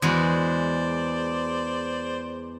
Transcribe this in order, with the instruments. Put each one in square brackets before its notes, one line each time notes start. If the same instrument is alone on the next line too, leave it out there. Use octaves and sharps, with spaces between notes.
[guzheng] E2 G#3 F#4 [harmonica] C5 D5